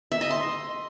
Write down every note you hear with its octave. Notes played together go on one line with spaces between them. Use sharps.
E5
D#5
C6